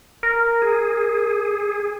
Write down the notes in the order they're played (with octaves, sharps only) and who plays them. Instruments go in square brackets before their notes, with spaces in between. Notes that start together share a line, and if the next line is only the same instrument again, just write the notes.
[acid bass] A#4
[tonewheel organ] G#4